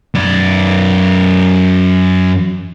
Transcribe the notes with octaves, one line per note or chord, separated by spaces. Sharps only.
F#2 D5